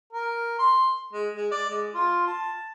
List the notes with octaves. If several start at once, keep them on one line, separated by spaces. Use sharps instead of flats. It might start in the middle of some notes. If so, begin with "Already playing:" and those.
A#4
C6
G#3
G#3
D5
G#3
F4
A5